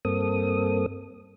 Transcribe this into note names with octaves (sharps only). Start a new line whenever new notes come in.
G2 A#3 C4 A4 D#6